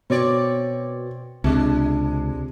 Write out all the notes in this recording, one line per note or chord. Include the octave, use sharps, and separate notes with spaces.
B2 C4 C#5 D5
C#2 C3 G#3 D4